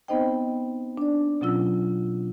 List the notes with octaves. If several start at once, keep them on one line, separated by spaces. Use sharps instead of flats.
B3 C4 D#4 C5 D#5 G5
D4 D5
B2 F#3 C#4 F4 E6